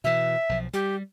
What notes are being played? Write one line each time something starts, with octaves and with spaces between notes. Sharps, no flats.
B2 E3 E5
B1 F3
G3 G4